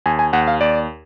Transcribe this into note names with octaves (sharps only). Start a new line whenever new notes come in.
D#2 G#5
G#5
D#2 F#5
F5
D#2 D5